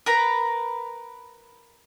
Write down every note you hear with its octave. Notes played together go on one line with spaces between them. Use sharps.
A#4 B4 A#5